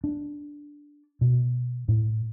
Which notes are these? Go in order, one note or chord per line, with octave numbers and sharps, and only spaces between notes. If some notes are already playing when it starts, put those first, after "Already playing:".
D4
B2
A2